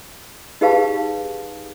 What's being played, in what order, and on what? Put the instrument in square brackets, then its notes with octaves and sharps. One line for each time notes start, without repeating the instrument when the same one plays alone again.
[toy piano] D#4 G4 G#4 B4 F5 A5